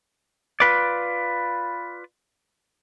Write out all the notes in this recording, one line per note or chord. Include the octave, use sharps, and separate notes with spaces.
F4 B4 D5